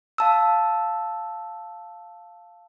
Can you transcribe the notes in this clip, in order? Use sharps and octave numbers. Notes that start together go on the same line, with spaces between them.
F5 A5 E6